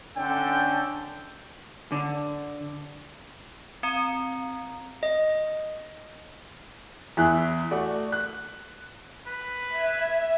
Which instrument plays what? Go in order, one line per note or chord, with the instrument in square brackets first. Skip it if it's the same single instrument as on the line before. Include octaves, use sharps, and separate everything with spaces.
[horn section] D3 C#4 D4 A4 G5
[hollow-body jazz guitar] D3
[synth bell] C4 A#5
[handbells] D#5
[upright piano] E2 E4 F#6
A3 F#4 D5
F#6
[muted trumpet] B4
[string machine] E5 G#6